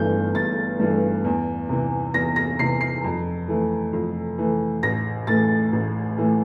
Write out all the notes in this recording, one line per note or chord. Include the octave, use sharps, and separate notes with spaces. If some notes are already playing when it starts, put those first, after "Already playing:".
Already playing: G1 G2 E3 A3 G6
G1 A6
G2 E3 A3
E2
C3 E3
E2 A#6
A#6
C3 E3 C7
C7
F2
E3 A3
F2
E3 A3
A1 A#6
A2 E3 A3 A6
A1
A2 E3 A3